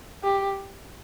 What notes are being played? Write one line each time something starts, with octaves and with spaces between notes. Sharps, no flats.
G4